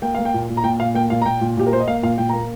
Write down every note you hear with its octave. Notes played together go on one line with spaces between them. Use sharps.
A#3 G5
A#3 F5
G5
A#2
A#2
A#5
A#2 G5
A#2 F5
A#3 G5
A#2 F5
A#5
A#2 G5
A#2
A#2 G4
A#4
A#3 C5
D#5
A#3 F5
A#2 F5
A#2 G5
A#3 A#5